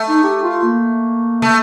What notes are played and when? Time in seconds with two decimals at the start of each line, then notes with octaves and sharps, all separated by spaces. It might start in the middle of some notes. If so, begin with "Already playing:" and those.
Already playing: A3
0.09 D#4
0.23 G4
0.44 F4
0.63 A#3
1.42 A3